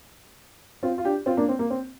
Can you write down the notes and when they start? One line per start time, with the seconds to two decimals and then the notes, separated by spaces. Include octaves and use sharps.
0.83 C4 F4
0.98 F4
1.05 D4 G4
1.26 C4 F4
1.37 A#3 D4
1.49 C4
1.59 A#3
1.70 C4